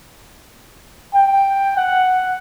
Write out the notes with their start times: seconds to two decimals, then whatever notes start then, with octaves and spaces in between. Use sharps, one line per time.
1.14 G5
1.76 F#5